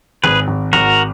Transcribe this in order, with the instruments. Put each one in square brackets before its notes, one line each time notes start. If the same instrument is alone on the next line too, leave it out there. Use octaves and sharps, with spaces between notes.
[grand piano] G#1 [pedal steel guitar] G#4 B4
[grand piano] G#1
[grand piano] G#1 [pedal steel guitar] F#4 A#4